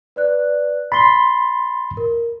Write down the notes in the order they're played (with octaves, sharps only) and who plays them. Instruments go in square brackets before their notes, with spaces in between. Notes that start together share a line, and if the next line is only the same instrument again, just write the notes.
[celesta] B4 D5 F#6
[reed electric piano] B5 C6 [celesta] A6 G7
[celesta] A#4